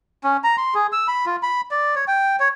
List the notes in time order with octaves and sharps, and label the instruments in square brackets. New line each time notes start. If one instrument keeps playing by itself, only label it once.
[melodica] C#4
A#5
C6
G#4
E6
B5
F4
B5
D5
C#5
G5
C#5